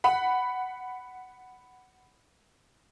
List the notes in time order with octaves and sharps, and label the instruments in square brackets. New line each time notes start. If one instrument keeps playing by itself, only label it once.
[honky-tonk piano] F#5 B5